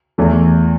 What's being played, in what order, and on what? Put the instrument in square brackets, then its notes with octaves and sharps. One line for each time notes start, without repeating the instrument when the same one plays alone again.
[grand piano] E2 E3 A3